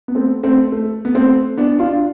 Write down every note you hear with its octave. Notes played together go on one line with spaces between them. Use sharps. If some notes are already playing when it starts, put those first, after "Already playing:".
B3
A3 C4
A3 C4
A3
B3
A3 C4
B3 D4
D4 F4